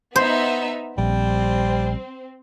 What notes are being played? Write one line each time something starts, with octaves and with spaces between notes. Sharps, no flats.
B3 D#4 C5 E5
A#1 G3 C4